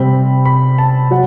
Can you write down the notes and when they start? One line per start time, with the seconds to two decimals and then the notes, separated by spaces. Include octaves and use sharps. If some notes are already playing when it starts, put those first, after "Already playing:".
Already playing: C3 G3 C4 B5
0.45 B5
0.78 A5
1.11 F#3 F#5